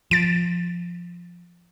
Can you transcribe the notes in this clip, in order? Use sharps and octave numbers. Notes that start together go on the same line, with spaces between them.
F3 A6 D7